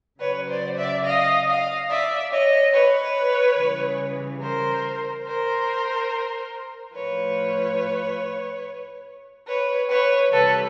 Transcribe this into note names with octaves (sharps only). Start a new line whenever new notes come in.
C#3 F#3 B4 C#5
C5 D5
D5 E5
D#5 F5
D#5 F5
D5 E5
C#5 D#5
B4 C#5
C#3 E3 G3
A#4 C5
A#4 C5
A2 F3 B4 C#5
B4 C#5
B4 C#5
C3 E3 G3 A4 B4